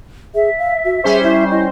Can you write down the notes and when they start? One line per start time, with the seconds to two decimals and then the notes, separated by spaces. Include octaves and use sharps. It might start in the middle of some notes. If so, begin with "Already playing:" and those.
0.35 G#4 E5
0.59 F5
0.85 F#4
1.04 G3 C#4 G#4 C5
1.23 E4
1.51 E4 D#5